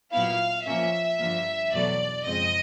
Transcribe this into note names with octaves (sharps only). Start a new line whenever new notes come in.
A#2 F#3 B3 E4 F5
A#2 F3 A#3 C#4 E5
G2 D3 F3 A#3
E2 B2 F#3 A3 D5
F#2 C#3 F3 G#3 C4 D#5